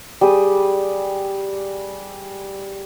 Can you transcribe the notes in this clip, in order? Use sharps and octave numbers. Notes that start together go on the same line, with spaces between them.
G3 G#4 D#6